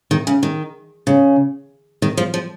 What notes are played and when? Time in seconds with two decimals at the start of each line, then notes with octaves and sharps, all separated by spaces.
0.11 D#3
0.27 C#3
0.43 D#3
1.07 C#3
2.02 D#3
2.17 F3
2.34 F3